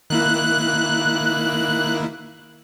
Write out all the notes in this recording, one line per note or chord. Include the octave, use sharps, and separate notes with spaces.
D#3 A#3 E4 F#6